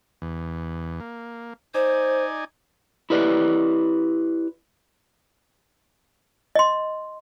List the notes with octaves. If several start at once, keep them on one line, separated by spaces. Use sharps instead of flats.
E2
A#3
D#4 C5 D5 G#5
E4 G4 B4 D5
D#5 C6